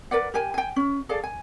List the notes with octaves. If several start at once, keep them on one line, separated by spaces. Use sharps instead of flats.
A#4 B4 D5 F#5
G4 A#4 G5 G#5
G5 G#5
C#4
G#4 A4 D5 F5
G#5